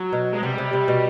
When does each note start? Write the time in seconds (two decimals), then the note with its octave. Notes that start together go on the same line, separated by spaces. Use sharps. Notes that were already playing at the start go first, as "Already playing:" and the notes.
Already playing: F#3
0.13 B2
0.33 G#3
0.43 C3 G3
0.58 C3
0.73 C3
0.88 B2